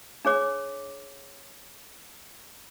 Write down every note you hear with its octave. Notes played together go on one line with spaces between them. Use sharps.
D4 G#4 C#5 D6